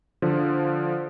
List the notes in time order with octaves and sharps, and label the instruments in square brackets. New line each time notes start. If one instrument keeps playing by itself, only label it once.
[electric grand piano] D3 F3